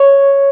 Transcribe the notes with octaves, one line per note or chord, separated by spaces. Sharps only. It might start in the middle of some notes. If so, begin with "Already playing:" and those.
Already playing: C#5